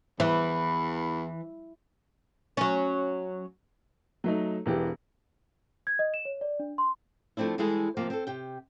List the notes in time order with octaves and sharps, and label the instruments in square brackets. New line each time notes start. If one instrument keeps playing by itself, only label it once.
[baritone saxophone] E2 [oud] E3
[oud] F#3 C#4
[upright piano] F#3 A3 D#4
E1 E3 G4
[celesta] G#6
D#5
E7
C#5
D5
D4
C6
[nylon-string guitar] F3 A3 C4 D4 E4
E3 G3 G#3 E4 G#4 A4
C3 F3 A#3
C4 A4
C3 G4 G5